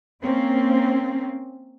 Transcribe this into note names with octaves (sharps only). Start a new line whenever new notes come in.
A#3 C4 C#4